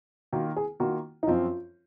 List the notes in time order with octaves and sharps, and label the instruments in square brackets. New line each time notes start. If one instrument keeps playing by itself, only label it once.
[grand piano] D#3 A#3 F4 [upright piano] F#4
[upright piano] G#4
[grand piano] D#3 A#3 F4 [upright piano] F#4
[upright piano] D#4
[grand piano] F#2 F3 C4 [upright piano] F4